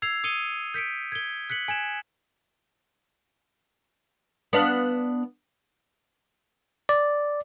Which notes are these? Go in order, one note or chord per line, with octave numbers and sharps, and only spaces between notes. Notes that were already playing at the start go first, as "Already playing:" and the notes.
E6 G#6 C7 F7
D#6 C#7 D#7 G7
G6 B6 C#7 D7
G#6 G7
F#6 B6 C#7 F#7
G#5 G#6 E7
B3 D4 F5
D5